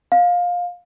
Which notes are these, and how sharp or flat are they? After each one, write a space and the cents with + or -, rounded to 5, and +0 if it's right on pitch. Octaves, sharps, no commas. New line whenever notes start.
F5 +20